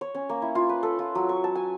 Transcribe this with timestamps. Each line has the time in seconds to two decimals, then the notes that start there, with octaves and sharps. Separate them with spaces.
0.01 C#5
0.15 C#4
0.29 A#3
0.42 E4
0.55 F4
0.69 B4
0.83 A4
0.99 F4
1.15 F#3
1.29 C#6
1.44 A5
1.55 G#5